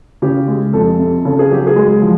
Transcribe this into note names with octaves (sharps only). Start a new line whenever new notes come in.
C#3 G4
G#3
F2 A4
C3
C#3 A4
G#4
F#3 G4
G#4
G#3
F3